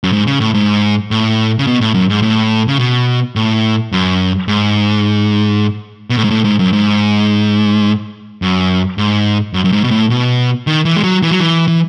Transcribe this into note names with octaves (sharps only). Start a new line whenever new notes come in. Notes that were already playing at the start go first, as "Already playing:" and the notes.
F#2
G#2
C#3
A2
G#2
A2
C#3
B2
A2
F#2
G#2
A2
C#3
B2
A2
F#2
G#2
B2
A2
G#2
A2
G#2
F#2
G#2
F#2
G#2
F#2
F#2
G#2
B2
A2
B2
D#3
E3
G#3
F#3
E3
F#3
E3
E3